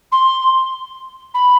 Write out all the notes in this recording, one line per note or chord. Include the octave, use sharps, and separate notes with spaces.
C6
B5